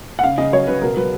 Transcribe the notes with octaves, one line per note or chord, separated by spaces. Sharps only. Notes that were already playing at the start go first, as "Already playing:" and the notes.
F#5
C#3 F5
C#3 D#5
F#3 C#5
C#3 B4
B2 A#4
F#3 B4